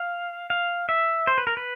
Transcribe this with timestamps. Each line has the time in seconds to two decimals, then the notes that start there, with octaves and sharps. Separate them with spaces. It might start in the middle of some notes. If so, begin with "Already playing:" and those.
Already playing: F5
0.50 F5
0.89 E5
1.27 C5
1.38 B4
1.47 A#4
1.57 B4